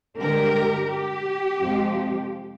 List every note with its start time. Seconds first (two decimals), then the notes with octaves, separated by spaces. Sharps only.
0.18 G2 D3 G#3 G4 A#4
0.89 G4
1.60 F2 C3 F3 G#3